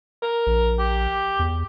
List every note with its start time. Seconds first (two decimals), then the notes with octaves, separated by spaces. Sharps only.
0.22 A#4
0.47 A#1
0.79 G4
1.39 E2